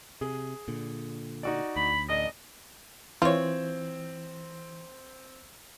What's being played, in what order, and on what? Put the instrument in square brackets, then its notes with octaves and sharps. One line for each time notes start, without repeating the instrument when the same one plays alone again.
[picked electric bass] C3 [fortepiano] G#4
[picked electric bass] A#2 D3
[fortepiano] D#4 F#4 D5
[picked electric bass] D2 [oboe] B5
[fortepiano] A1 D5 [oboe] D#5
[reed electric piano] E3 [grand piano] C4 [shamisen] F4 [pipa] C5 C#5